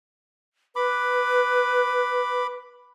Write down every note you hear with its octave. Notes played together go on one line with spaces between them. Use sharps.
B4 B5 D6